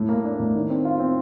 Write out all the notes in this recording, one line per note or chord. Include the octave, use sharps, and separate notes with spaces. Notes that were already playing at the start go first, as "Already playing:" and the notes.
Already playing: A2
A#3
D4
A2
D#3
C4
F4
C4